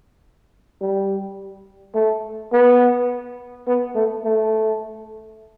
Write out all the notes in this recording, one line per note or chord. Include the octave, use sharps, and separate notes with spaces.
G3
A3
B3
B3
A3
A3